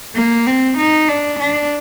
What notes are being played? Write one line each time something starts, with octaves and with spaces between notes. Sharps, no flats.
A#3
C4
D#4
D4
D4